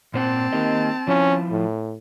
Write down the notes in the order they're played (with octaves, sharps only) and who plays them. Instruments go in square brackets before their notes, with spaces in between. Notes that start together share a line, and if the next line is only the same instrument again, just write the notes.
[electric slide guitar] A#2 C5 F#5 [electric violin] C4 A5
[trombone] D#3 [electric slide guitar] A#3 G4 D#5
[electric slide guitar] F3 E4 F4 [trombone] C#4
[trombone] A2